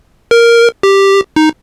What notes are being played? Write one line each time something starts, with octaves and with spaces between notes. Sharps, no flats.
A#4
G4
D#4